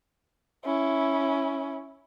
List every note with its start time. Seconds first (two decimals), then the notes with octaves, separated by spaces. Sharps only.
0.64 C#4 E4